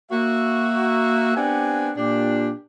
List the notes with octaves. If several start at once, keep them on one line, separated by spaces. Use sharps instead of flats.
A#3 F#4 E5
B3 C4 D4 G4 F#5 G#5
A#2 D4 G4